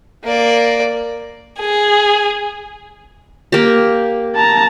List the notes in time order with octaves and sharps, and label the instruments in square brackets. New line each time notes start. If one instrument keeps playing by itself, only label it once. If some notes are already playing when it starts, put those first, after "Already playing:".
[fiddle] A#3 D5
[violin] G#4
[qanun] A#3 G4
[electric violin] A5 A#5